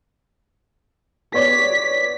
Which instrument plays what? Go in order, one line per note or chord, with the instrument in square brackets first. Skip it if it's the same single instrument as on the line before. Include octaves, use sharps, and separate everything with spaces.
[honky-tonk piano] B3 C#5 D5 [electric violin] B6